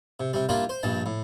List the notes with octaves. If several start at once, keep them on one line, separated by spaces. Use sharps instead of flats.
C3
C3 G3
G3 A#3 D4 E4 F4
C5
A#1 G2 G3 A5
A2